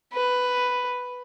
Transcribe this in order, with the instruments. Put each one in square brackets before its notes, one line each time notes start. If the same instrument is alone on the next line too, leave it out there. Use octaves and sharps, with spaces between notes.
[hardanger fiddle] B4